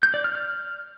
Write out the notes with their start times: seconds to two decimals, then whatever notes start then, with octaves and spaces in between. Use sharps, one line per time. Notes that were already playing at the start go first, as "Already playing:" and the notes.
0.03 G6
0.14 D5
0.24 F6
0.35 F6